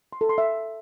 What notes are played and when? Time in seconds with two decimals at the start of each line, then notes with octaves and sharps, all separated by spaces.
0.13 C6
0.21 A4
0.29 C6
0.38 E5